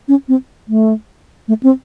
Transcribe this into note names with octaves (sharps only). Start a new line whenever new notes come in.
C#4
C4
A3
A3
C4